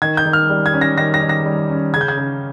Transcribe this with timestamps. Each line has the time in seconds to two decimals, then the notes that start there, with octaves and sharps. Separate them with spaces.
0.02 D#3 G#6
0.17 G6
0.25 D#3
0.33 F6
0.49 G3
0.66 G#6
0.74 C#4
0.81 A#6
0.98 D#3 A#6
1.14 A#6
1.21 D#3
1.29 A#6
1.45 G3
1.70 C#4
1.93 C#3 G#6
2.01 G6
2.08 G#6
2.17 C#3